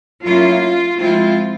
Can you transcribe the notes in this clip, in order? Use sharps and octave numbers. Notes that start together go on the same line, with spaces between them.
F#3 A#3 C#4 E4 F4
F3 G#3 C4 E4 F4